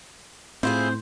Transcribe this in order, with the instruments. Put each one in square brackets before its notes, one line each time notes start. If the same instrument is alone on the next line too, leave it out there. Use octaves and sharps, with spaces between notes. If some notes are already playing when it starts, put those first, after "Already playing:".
[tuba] A2 [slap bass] C4 [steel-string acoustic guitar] E4 F4 G#4 [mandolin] C5